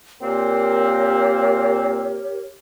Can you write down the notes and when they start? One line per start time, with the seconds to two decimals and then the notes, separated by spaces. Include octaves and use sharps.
0.21 A#2 A#3 C4 G4 A#4 C#5